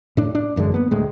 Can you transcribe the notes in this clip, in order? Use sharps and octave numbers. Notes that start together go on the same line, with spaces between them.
A2 D4
D4
A1 F#2 D3 G#3
A#3 B3
D2 A2 G#3